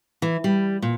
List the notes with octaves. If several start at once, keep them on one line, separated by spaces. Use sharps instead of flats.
E3
G3
A#2